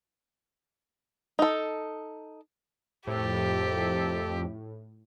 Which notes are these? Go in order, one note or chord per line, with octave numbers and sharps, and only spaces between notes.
D#4 A4
C2 F2 A2 C3 G4 A4